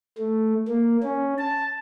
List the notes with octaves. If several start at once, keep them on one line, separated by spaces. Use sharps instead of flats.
A3
A#3
C#4
A5